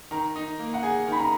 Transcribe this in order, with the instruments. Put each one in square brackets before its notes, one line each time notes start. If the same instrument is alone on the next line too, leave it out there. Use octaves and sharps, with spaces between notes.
[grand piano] D#3 [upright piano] A#5
[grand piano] D#4
A#3
[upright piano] F#5
[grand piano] G#4 [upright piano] G#5
[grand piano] D#3 [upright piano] B5
[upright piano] A#5